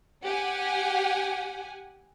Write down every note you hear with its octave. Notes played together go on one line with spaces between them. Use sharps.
G4 F#5 G#5